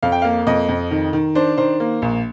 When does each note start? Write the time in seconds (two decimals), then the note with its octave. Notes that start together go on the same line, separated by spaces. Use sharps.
0.03 F2 F5
0.12 G5
0.22 A#3 F5
0.47 F2 D#5
0.69 F2
0.91 D#3
1.13 D#3
1.35 D4 C5
1.57 D#3 C5
1.80 A#3
2.02 A#1